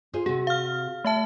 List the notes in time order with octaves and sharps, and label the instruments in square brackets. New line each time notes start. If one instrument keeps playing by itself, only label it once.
[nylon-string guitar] F4 G#4 C5
[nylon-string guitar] C3 F#4 [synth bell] G#4
[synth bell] F5 F6
A3 E5 A5